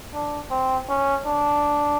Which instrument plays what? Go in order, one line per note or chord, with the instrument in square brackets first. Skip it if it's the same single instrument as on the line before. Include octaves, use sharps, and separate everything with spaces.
[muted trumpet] D4
C4
C#4
D4